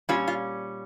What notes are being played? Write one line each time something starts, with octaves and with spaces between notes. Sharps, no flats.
A#2 G3 C#4 F4
F4